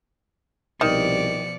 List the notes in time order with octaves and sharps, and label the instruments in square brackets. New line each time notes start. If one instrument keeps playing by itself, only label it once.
[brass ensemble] C2 [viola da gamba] B2 F3 D5 [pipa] D#3 [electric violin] C#7